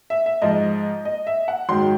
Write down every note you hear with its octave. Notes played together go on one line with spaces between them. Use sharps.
E5
E5
G#2 F3 D#5
D#5
E5
F#5
G#2 D#3 F#3 C6